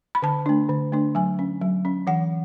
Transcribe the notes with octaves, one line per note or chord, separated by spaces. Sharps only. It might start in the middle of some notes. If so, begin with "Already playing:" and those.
B5
D3 A5
A3 D4
D3
A3 D4
F#3 G#5
C#4
F#3
C#4
E3 F#5